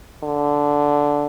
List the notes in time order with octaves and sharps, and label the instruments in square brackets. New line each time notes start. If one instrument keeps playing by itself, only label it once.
[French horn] D3